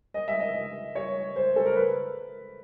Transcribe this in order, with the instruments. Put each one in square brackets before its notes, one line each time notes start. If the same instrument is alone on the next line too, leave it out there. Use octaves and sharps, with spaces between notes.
[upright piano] D#5
E5
D#5
C#5
C5
A4
A#4
B4